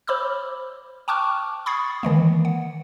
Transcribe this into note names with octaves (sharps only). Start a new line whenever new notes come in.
C5 C#5 B5 D6 E6 F6
G5 A5 C#6 D6 F6 F#6
B5 C#6 D#6 G#6 A6 C7
D#3 E3 G#3 A#3
F#5